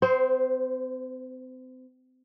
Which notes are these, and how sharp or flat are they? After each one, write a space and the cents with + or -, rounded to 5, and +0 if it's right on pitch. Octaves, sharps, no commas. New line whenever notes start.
C4 -35 C5 +0